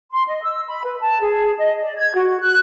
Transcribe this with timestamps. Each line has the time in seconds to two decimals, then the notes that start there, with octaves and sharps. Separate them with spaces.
0.11 C6
0.27 D#5
0.44 E6
0.68 B5
0.84 B4
1.01 A5
1.21 G#4
1.57 D#5
1.81 D5
1.97 G#6
2.14 F#4
2.40 F#6